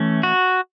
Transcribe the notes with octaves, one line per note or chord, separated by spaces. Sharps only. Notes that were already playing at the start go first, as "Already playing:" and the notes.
Already playing: E3 A3 C#4
F#4